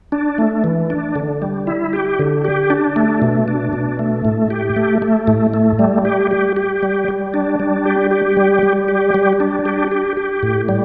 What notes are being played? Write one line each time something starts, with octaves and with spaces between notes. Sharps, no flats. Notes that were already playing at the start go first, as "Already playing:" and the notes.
D4
A3
E3
D4
D3
G3
E4
G4
D3
G4
D4
A3
B2
D4
B2
A3
A2
G4
A3
A3
A2
A3
G3
G4
G4
G4
G3
G3
D4
G3
G4
G4
G3
G3
G4
G3
D4
G4
G4
G4
A2
G3